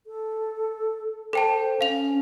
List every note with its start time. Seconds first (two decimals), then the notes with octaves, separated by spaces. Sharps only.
0.07 A4
1.33 A4 C5 G5 A5
1.81 C#4 F5 F7